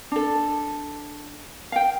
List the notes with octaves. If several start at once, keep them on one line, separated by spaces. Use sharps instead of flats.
D4 A4
F5 G5